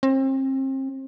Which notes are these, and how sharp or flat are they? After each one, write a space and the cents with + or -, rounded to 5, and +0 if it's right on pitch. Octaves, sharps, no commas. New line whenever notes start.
C4 +35